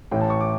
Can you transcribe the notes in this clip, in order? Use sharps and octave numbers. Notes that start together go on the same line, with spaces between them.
A1 A2 E3 G5
A5
C#6
D6